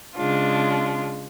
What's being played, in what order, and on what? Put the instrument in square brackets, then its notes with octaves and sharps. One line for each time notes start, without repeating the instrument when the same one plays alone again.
[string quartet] C#3 G#3 D4 F4